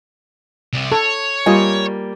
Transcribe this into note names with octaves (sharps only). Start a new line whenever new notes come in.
C2 C3
A4 C#5
G3 A#3 F4 D#5 G#5